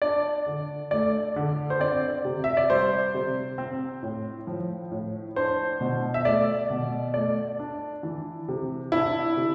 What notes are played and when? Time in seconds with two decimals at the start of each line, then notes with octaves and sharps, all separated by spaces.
0.02 D4 D5
0.46 D3
0.91 A3 D5
1.36 D3
1.70 C5
1.80 C4 D5
2.25 C3
2.44 E5
2.57 D5
2.70 G3 C5
3.14 C3
3.58 C4
4.03 A2
4.47 F3
4.91 A2
5.36 D4 C5
5.81 B2
6.14 E5
6.25 A3 D5
6.70 B2
7.14 A3 D5
7.59 D4
8.03 E3
8.48 C3
8.92 D4 E4
9.37 C3